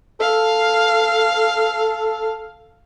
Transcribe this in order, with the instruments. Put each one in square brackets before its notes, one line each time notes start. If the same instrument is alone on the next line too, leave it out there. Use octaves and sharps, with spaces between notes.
[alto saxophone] A4 [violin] F5